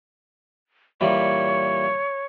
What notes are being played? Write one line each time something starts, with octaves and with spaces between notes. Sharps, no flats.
A#2 E3 G3 C#5